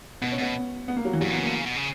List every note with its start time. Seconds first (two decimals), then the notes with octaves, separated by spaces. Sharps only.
0.22 B2 B3
0.32 C#4
0.38 B2 B3
0.88 B3
0.97 A#3
1.05 F#3
1.13 E3
1.21 G2 F#3
1.30 A#2
1.33 B3
1.37 C#3
1.43 A#3
1.47 D3
1.55 C#3
1.66 B2
1.76 C#3